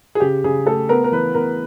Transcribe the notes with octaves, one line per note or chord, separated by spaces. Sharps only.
G#4
C#3 G4
C#3 G#4
A3 A4
B3 A#4
A#4
E3 B4
B3 A#4